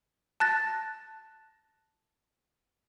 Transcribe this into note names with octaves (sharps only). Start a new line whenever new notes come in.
A5 F#6 A6 A#6